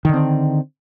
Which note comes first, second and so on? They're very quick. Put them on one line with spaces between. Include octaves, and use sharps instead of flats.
D#3 D3 C4